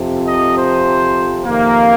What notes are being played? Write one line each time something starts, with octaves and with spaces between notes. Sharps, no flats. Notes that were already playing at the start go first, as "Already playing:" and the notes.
Already playing: F2 C3 F3
D#5
C5
F2 C3 D#3 A#3